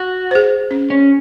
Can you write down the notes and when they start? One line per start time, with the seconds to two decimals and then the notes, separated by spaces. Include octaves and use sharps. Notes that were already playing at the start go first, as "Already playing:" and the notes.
Already playing: F#4
0.31 G#4 C5
0.71 C#4
0.90 C#4